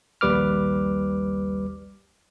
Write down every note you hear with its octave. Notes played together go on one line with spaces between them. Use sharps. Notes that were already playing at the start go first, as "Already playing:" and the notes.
A#1 D#2 G3 B4 D6 F6